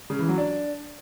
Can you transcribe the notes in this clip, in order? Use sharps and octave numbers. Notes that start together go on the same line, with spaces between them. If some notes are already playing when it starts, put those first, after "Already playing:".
C#3
E3
F#3
D4